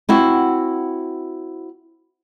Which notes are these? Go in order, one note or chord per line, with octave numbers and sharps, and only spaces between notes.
C4 E4 F#4